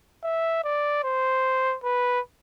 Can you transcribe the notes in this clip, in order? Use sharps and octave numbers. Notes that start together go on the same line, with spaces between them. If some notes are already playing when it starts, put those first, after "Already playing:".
E5
D5
C5
B4